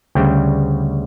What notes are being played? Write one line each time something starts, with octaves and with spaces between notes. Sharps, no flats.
D2 C#3 G3 G5